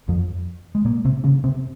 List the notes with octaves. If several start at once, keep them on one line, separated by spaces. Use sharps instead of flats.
F2 F3
G#3
A#2 A#3
C3 C4
C#3 C#4
C3 C4